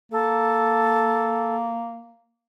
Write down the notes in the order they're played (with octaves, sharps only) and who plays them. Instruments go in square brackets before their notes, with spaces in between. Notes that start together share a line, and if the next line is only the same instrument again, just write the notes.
[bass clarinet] A#3 [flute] A4